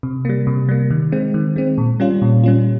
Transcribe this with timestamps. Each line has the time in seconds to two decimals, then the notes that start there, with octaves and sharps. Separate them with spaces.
0.03 C3
0.25 G3 A#3
0.47 C3
0.69 G3 A#3
0.91 D#3
1.12 G#3 C4
1.34 D#3
1.56 G#3 C4
1.78 A#2
2.00 G3 C#4 F4
2.22 A#2
2.44 G3 C#4 F4